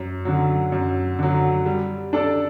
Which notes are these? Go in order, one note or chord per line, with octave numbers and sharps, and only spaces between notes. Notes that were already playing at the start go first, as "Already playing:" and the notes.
Already playing: F#2
D3 F#3
F#2
D3 F#3
G3
D4 A4 D5